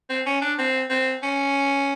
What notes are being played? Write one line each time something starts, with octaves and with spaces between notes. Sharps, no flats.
C4
C#4
D4
C4
C4
C#4